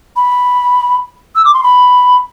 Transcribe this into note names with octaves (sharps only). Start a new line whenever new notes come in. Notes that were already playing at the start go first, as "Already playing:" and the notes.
B5
E6
D6
C6
B5